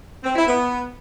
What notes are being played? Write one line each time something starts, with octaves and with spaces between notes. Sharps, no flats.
C4
E4
B3